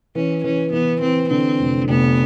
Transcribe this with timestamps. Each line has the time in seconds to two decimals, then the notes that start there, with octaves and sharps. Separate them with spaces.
0.15 E3 C#4
0.44 E3 C#4
0.73 E3 B3
1.02 E3 C4
1.30 D3 C4
1.60 F1
1.88 F1 B3